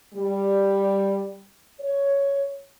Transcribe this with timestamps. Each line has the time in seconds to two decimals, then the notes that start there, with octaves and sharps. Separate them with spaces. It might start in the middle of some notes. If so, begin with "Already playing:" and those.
0.15 G3
1.79 C#5